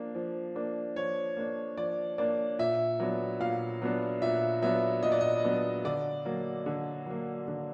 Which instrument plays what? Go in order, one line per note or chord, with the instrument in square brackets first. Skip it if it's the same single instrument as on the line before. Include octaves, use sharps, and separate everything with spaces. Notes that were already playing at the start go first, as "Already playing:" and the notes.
Already playing: [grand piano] F3 A#3 D4
F3
A#3 D4
F3 C#5
A#3 D4
F3 D5
A#3 D4 D5
A#2 E5
F#3 B3 D4
A#2 F5
F#3 B3 D4
A#2 E5
F#3 B3 D4 E5
A#2 D#5
D5
D#5
F#3 B3 D4
D3 D5
F#3 A#3
D3
F#3 A#3
D3